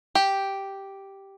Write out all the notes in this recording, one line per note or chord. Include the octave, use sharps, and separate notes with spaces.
G4